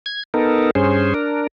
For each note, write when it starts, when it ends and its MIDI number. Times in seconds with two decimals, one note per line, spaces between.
0.06 0.23 92
0.34 0.71 59
0.34 0.71 63
0.34 0.71 69
0.34 0.71 70
0.75 1.14 43
0.75 1.14 61
0.75 1.14 68
0.75 1.14 72
1.14 1.47 62
1.14 1.47 70